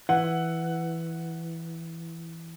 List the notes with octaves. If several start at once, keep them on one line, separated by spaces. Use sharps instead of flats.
E3 F#5